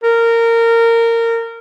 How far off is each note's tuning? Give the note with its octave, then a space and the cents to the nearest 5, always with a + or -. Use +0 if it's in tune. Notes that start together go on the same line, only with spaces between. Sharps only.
A#4 -20